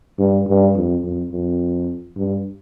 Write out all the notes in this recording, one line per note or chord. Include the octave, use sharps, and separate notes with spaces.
G2
G2
F2
F2
F2
G2